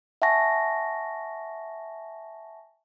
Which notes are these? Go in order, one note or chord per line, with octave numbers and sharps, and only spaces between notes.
E5 F#5 G#5 A5 C#6 A#6